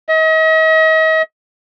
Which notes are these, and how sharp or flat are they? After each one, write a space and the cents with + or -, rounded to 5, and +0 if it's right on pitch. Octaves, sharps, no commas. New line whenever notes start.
D#5 +40